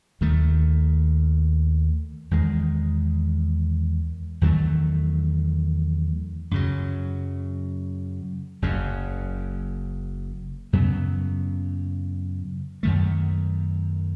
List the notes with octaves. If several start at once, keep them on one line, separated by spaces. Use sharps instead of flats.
D#2 D#3 A3
E2 D#3 G#3
E2 D#3 F#3 A3
F#2 C#3 F#3
F#1 F#2 C#3
F#2 C#3 F#3 B3
F#2 D#3 A3